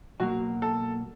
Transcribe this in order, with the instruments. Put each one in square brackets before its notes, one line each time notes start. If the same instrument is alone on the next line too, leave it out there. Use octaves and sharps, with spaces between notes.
[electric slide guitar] B2 F#3 A#3 [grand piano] F#4
[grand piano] A4